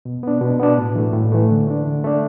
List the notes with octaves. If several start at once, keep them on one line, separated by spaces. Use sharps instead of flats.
B2
B3 D4
B2
B3 D4
A2
E3 A3
A2
E3 A3
D3
A3 D4
D3
A3 D4